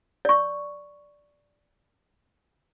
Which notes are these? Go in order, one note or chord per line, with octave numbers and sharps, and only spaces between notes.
D5 C#6